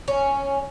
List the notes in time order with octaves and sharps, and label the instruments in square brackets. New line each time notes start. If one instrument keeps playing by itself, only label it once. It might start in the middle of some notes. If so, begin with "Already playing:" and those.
[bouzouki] C#4